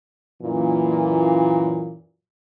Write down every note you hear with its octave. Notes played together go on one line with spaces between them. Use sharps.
F#2 A#2 E3